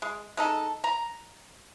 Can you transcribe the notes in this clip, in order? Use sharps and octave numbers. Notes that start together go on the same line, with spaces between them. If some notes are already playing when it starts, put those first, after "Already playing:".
G#3
G#3 D#4 A4
A#5